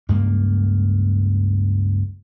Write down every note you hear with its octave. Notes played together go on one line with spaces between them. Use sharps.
C#2 G2 A#3